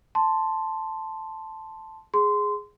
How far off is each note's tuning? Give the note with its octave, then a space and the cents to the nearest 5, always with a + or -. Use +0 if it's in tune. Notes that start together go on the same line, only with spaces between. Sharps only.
A5 +0 C6 +0
G#4 +0 C6 -20